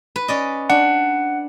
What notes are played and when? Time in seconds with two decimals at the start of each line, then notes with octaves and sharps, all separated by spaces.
0.16 B4
0.28 C#4 D5 D#5
0.70 D4 F#5